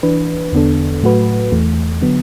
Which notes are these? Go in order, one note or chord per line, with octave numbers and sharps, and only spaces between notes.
E3 D4 B4
E2 D3 B3 D4 A4
A2 F#3 A3 F#4 B4
E2 E3 A3
D3 F#3 B3